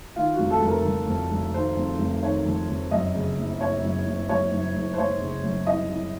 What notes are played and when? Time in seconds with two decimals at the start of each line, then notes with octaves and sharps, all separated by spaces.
0.16 D#3 F4
0.34 F#4
0.39 F1
0.50 A4
0.62 F1
0.67 A#4
0.85 F1
1.08 F2
1.31 F1
1.54 D#3 C5
1.77 F2
1.99 F1
2.23 D#3 C#5
2.46 F2
2.69 F2
2.91 F#2 D#5
3.15 C#3
3.37 F#1
3.60 F#1 C#5
3.83 F#2
4.06 F#1
4.29 F#2 C#5
4.52 F#1
4.75 F#1
4.94 C5
4.98 F#1 C#5
5.20 C#3
5.43 F#2
5.67 C2 D#5
5.89 C2